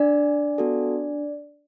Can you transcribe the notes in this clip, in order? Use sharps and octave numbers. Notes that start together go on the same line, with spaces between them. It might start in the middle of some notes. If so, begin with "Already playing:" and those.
Already playing: D4 D5
B3 F#4 A4